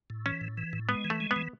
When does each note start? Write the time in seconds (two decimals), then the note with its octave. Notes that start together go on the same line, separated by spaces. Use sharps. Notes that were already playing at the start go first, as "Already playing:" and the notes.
0.10 A2
0.26 E3 C#4
0.41 A2
0.57 E3
0.73 A2
0.89 G#3 B3
1.04 E3
1.10 A3
1.20 G#3
1.31 B3
1.36 E3